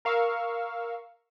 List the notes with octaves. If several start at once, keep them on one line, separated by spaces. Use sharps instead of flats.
A#4 F5 C#6 E6